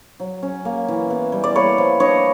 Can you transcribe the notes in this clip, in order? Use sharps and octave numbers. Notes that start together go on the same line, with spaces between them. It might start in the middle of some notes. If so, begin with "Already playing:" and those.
F#3
C#4
A#3
E3
B3
G3
D5
A#3 B4 C#5
F3
D4 C#5 D#5